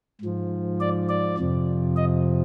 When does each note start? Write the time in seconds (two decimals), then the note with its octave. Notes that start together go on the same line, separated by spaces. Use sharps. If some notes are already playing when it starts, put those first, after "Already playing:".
0.21 G#2 F3
0.81 D5
1.09 D5
1.38 F2 C3 F3
1.96 D#5